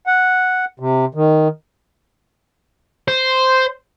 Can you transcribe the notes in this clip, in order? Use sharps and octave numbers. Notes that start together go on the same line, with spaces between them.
F#5
C3
D#3
C5